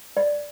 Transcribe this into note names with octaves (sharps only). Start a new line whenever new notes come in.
D5